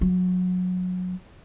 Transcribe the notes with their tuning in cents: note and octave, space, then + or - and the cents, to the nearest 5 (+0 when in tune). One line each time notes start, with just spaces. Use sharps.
F#3 -25